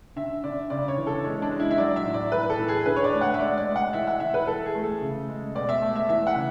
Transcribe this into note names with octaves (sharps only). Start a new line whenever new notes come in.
D3 E5
D3 D5
C#3 D5
C#5
E3
A4
G#3 C#4
D4
G#3
E4
E5
F#3 D5
E5
A2
D5
E3 B4
A4
A2
G#4
D3 B4
C#5
D5
A3
F#5
E5
G#3 D5
D5
G#3
F#5
E3 E5
F#5
E3 E5
B4
E3 A4
G#4
A3
A4
C#3
G#3
B2 D5
E5
A3
E5
E3 E5
F#5
C#3